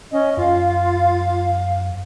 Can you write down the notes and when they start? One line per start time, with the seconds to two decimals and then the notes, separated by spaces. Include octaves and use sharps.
0.12 C#4 D#5
0.37 F#2 F4 F5